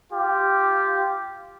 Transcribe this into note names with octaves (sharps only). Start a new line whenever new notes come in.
F4 G4